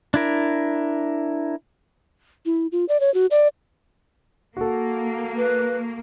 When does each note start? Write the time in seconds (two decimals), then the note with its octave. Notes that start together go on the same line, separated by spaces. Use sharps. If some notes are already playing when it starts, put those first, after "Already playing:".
0.14 D4 E4 A#4
2.46 E4
2.72 F4
2.89 D5
3.00 C#5
3.14 F#4
3.31 D5
4.57 A#3 F#4 A4
5.37 B4